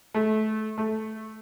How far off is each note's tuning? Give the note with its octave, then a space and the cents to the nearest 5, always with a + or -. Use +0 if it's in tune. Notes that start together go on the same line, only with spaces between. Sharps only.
A3 -25
A3 -10